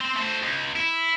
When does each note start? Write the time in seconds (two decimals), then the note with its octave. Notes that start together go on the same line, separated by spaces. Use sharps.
0.01 C4
0.16 A3 C5
0.43 C#2
0.76 E4